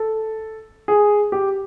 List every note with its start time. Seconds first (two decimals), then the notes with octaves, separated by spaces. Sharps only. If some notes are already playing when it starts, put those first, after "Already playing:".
Already playing: A4
0.88 G#4
1.32 G4